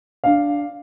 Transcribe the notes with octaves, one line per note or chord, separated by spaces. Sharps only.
D4 F5